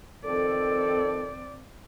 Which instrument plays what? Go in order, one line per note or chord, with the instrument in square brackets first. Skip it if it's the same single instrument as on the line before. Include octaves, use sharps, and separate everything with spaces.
[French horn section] F2 D#3 A4 [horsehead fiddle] C4 D5